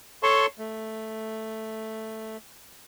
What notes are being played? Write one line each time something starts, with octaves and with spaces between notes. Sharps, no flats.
A4 C#5 A5 C6 C#6
A3